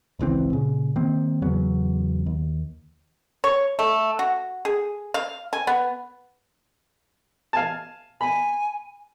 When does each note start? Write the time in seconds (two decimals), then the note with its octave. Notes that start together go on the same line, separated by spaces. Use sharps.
0.19 G#1 C#2 E3 C4
0.52 A#2 C#3
0.96 D#3 A#3 C4
1.42 E2 C#3 F#3 B3
2.26 D#2
3.44 C#5
3.79 A3
4.19 F#4
4.65 G#4
5.14 F5
5.53 G#5
5.67 B3
7.53 F5 G#5 A5
8.21 G#5 B5